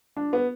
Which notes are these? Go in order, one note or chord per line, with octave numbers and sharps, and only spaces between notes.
D4
B3